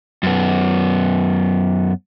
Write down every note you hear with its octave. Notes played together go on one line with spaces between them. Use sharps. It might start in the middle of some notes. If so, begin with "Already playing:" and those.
F#2 B3